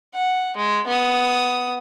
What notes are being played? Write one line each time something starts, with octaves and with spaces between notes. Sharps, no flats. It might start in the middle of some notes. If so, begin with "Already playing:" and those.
F#5
G#3
B3 D#6